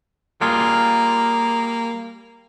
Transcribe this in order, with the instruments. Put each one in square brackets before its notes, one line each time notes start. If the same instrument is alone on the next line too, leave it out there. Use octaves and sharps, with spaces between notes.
[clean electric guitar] G3 F4 G#4 [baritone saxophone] A#3